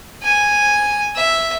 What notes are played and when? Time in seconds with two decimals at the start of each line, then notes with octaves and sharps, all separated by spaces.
0.23 G#5
1.16 E5